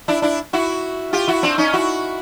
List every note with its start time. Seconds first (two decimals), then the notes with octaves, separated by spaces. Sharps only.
0.08 D4 E4
0.22 D4 E4
0.53 E4 F#4
1.13 F4 G4
1.28 E4 F#4
1.43 C4 D4
1.58 C#4 D#4
1.73 E4 F#4